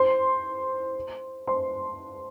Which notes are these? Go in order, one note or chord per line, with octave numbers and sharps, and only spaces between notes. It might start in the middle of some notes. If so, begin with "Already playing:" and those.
Already playing: C5 C6
C5 C6